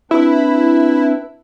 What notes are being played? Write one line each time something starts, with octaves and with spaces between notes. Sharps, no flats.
C4 D4 E4 B4